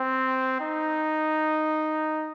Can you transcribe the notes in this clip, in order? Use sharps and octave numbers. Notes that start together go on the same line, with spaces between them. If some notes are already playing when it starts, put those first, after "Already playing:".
Already playing: C4
D#4